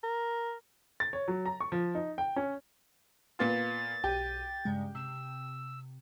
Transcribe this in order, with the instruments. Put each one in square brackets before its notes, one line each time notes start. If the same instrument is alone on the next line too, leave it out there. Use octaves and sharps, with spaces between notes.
[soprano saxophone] A#4
[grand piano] A6
C#5
F#3
A#5
C#6
F3
D#4
G5
C#4
[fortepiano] A#2 B3 F4 [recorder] A6
[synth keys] B1 D#7 [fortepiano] G4
[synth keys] G2 C#3 G#3
[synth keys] C3 [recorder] E6